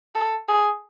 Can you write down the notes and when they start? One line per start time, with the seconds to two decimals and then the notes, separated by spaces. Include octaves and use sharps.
0.15 A4
0.49 G#4